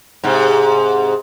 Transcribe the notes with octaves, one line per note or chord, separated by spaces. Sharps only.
G#2 C3